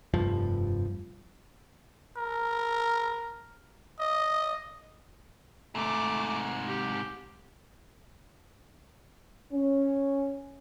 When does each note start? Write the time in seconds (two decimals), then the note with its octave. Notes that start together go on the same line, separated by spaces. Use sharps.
0.14 F1 G2 F3
2.17 A#4
3.99 D#5
5.75 G#2 C3 A3 D6
6.68 G4
9.53 C#4